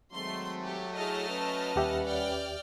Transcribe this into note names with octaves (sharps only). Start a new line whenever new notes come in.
D#3 F#3 G#3 A3 C4 C6
G4
E4 G#4 C#5 D#5 A5 F6
C#4 B4
D#2 G3 G4 E5 F#5
D5 G5 F6